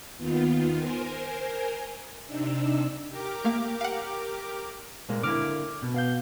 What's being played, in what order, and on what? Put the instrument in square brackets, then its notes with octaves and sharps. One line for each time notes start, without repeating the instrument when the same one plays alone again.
[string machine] D#2 D#3 B3 F4
A#4 C5 G#5
C3 D4 D#4 E6
[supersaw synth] G4 A#4 D6
[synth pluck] A3 A#3 F5
F5 F#5
[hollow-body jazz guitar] A#2 G#3 A#3
[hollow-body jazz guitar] D3 A#3 E4 [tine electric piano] D6 F6
[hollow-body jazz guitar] B2
[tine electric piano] B3 F5 G6